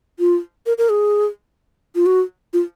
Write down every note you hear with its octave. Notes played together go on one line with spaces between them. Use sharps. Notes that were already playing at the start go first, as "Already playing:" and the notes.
F4
A#4
A#4
G#4
F4
F#4
F4